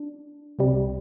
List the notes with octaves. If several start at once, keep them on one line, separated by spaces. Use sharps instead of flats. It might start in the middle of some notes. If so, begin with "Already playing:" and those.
Already playing: D4
C2 C3 G3